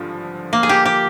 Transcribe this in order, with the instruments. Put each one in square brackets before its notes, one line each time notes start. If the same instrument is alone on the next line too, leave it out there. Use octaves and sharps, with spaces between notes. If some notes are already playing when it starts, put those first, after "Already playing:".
Already playing: [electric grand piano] G#1 G2 D3 F3
[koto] A#3
G#4
G4
G4